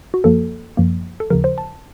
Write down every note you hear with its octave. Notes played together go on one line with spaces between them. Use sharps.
F#4
F#2 F3 A#3 A4
F#2 F3 A#3
A4
D#2 C#3 F3 A#4
C5
A5